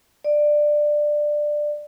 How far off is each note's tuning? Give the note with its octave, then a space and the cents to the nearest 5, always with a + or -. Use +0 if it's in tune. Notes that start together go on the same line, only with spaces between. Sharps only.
D5 +15